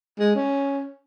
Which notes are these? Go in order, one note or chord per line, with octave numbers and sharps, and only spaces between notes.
G#3
C#4